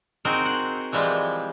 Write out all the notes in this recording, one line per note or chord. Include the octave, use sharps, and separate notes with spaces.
C4 D#4 F#4 G#4 A#4 C5
F#5
E3 F3 G3 G#3